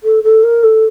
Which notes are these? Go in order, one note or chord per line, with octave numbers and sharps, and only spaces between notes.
A4
A4
A#4
A4